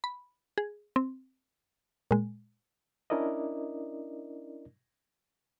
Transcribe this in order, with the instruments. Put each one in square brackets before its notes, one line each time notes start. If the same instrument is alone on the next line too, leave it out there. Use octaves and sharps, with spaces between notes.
[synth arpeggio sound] B5
G#4
C4
A#2 G#3
[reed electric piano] C#4 D4 E4 A#4 D5 D#5